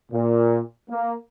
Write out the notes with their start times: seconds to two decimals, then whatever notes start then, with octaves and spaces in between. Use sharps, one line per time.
0.12 A#2
0.90 A#3